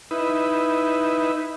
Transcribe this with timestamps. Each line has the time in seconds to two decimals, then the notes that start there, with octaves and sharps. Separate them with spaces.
0.11 D#4 E4 B4